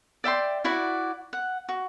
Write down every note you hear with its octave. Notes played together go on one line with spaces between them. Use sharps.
D5 E5 G5 C6
E4 F#4 D5 F#5
F#5
F#4